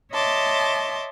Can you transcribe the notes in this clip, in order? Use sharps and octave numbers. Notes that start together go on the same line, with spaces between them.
C#5 D#5 E5 A5 C6 D6